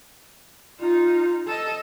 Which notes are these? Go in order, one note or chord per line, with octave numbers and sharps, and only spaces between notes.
D#4 F4
A4 D#5